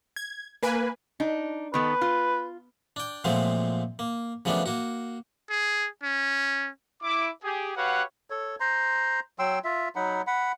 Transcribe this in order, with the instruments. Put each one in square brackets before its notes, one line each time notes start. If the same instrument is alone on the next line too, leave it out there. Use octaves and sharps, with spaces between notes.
[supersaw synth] G#6
A#3 B4 G#5
[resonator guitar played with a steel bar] D4 D#4
[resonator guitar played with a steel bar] D#3 B3 A4 [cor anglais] B4
[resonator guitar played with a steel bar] F4
[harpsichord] D4 G5
A#2 F3 F#3 G#3 A3 C4
A#3
C#3 F3 F#3 A3 B3 D4
A#3 F#4
[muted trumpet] G#4
C#4
[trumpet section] E4 D6
G4 G#4
F#4 G4 B4 C#5 F5 F#5
[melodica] A4 C#5
C5 A#5 C6
F#3 G5 C6 E6
F4 E5
F#3 D#4 F#5 B5
F#5 B5